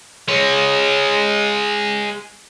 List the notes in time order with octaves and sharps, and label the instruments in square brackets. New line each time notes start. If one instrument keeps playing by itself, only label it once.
[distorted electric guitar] G#3 C#5